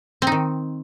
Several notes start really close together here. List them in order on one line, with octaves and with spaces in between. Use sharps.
C4 D#4 D#3